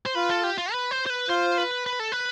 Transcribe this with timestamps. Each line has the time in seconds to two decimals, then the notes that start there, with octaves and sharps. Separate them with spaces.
0.06 C5
0.15 F4 B4
0.30 A4
0.44 G4
0.58 F4
0.72 B4
0.91 C5
1.06 C5
1.10 B4
1.29 F4 C5
1.58 B4
1.86 B4
2.00 A4
2.12 B4